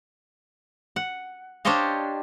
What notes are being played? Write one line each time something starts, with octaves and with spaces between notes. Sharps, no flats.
F#5
D4 G4 C5 C#5 D#5 F5